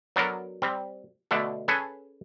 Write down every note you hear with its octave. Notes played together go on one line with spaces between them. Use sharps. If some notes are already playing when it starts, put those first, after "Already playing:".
F#3 B3 D4 F#4 A4 A#4
G3 C4
B2 D3 A3 D4 A4
C#4 G#4 A4 B4 G#5 A5